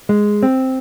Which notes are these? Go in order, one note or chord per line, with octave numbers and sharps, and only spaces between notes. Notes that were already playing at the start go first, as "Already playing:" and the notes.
G#3
C4